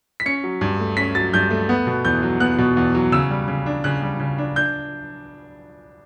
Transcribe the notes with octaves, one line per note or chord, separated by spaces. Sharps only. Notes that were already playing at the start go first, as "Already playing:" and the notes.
B6
C#4 C#7
F#3
G2
A3
C#4 B6
F#3 A6
G2 G6
A3
B3
B2
E2 G6
F#3
B3 F#6
B2
E2
F#3
C#3 E6
G3
C#3
D4
C#3 F#6
G3
C#3
D4
D4 G6